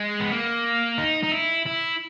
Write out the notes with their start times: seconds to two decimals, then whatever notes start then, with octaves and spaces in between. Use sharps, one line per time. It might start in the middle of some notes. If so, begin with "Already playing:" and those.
Already playing: G#3
0.20 B3
0.32 A#3
0.98 D#4
1.23 D#4
1.31 E4
1.66 E4